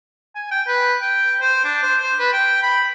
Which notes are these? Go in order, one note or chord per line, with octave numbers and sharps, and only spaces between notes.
G#5
G5
B4
G5
C5
D4
C5
C5
B4
G5
B5